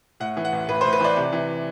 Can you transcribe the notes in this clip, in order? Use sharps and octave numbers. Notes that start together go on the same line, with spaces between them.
A2 F#5
E3
F#5
A1
A1 B4
C5
A2
B4
E3 D5
C3
E3